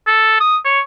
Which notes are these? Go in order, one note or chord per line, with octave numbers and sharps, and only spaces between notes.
A4
D#6
C#5